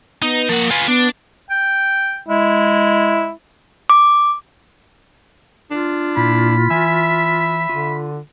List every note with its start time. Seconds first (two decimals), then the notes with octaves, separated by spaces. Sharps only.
0.22 B3 D#4
0.49 F3 A#3 F#5
0.71 F4 B4 G#5
0.88 B3 D4
1.50 G5
2.28 G#3 E4
3.90 D6
5.71 D4 F4
6.17 A#2 E4 B5
6.70 E3 E5 G#5
7.69 D3 F4